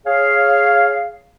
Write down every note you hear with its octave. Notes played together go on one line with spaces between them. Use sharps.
G#4 C#5 F5